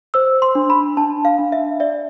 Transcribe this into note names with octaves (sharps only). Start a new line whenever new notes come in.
C5 E6
C6
D4
B5
D4 A5
F5
D4
E5
D5 E5